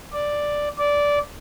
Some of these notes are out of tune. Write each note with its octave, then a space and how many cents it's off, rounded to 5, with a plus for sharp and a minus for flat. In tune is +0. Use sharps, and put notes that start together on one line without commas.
D5 +0
D5 -15